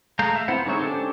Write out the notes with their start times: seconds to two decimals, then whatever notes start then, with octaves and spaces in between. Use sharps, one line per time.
0.19 G#3 A3 F5 A#5 G6
0.36 E5
0.48 B3 C4 E4 C5 F#5
0.65 D3 G#3 D#4 C#5 E5
0.79 C#4 D4 G4 A4 C5